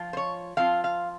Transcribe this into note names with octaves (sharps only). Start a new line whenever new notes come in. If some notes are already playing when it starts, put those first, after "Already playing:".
Already playing: F3 F4
C5
C#5
F3 C4 F4 F5
F5